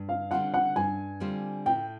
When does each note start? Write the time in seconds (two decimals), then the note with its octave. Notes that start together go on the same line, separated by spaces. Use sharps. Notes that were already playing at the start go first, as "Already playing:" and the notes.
Already playing: G2
0.09 F5
0.31 D3 G3 C4 F4 F#5
0.54 F#5
0.76 G2 G#5
1.20 D3 G3 C4 F4
1.66 A2 G5